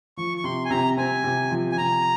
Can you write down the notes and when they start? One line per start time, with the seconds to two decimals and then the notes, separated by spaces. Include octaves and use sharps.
0.17 F3 C#6
0.37 C#6
0.44 C3 C6
0.65 G#5
0.70 C3 A#5
0.97 C4 G#5
1.24 C3
1.51 F3
1.72 G#5
1.78 C3 A#5